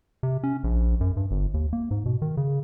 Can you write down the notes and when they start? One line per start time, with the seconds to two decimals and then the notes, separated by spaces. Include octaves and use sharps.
0.23 C3
0.43 C#4
0.64 A#1
1.01 F#2
1.16 G2
1.31 G1
1.54 D#2
1.73 A#3
1.91 G#2
2.06 B2
2.22 D#3
2.37 C#3